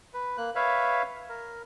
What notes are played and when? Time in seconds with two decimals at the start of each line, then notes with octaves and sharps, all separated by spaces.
0.14 B4
0.38 A#3 F#6
0.55 B4 C#5 E5 F5
1.29 A#4